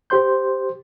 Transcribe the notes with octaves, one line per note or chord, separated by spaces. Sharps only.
G4 C5 C6 G6